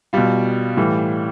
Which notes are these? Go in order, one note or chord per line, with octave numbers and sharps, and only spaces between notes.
B2 G3 F4
A2 E3 G3